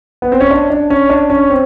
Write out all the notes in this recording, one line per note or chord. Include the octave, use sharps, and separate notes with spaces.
B3
C4
C#4
D4
D4
C#4
D4
C#4
C4